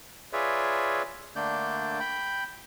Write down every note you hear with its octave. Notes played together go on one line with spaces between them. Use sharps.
F4 G#4 B4 C#5 D5 E5
D3 A3 A#3 D4 D5 G6
G5 B5 G6